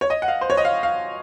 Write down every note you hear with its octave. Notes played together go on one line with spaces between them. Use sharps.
C#5
D#5
F#5
F5
C5
C#5
D#5
F5
F5